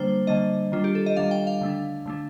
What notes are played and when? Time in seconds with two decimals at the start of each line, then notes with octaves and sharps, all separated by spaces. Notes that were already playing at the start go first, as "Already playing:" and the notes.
Already playing: D3 G3 A#3 D4 C5
0.27 D3 G3 A#3 D4 D#5
0.72 D#3 G3 D4 F4
0.84 G4
0.95 A4
1.06 D#5
1.16 D#3 G3 D4 F5
1.31 G5
1.47 F5
1.61 D3 A3 D4
2.06 D3 A3 D4